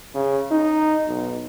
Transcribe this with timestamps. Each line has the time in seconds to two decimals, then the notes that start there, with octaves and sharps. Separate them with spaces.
0.14 C#3
0.51 D#4
1.08 B1